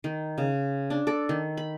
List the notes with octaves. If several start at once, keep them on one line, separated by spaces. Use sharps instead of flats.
D#3
C#3
D4
A4 D5
D#3
B5